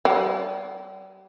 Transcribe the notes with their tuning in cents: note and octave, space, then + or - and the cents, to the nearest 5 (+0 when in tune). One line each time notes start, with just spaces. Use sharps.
G3 -35 F#5 +0